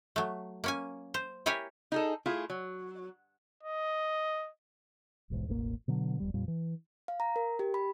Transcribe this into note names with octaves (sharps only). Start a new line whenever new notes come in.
F#3 A3
A#3 C#4 G#5
C5
E4 G4 A#4 C#5 G#5
D#4 G#4 A4
A3 E4 F4 G#4
F#3
D#5
D#1 B1 E2 G#2
E1 A1 C3 A#3
B2 D3 F#3
F1 E2 G3
F2 A#2 G3
E3
F5
A#5
A#4
G4
B5